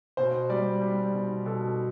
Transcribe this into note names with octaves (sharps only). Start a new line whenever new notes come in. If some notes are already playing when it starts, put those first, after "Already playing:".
B2 C5
G3 D5
G3
B2
B2 A4